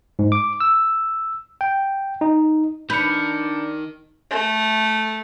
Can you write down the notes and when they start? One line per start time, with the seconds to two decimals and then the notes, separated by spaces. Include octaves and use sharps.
0.19 G#2
0.32 D6
0.61 E6
1.61 G5
2.21 D#4
2.90 D#3 D4 B4 G6 C#7
4.30 A3